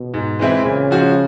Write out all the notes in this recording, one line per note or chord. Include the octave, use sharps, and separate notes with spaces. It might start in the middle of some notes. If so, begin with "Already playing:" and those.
Already playing: B2
G#2
E3 G#3 C4 E4
A#2 C#3
F3 G#3 C#4 F#4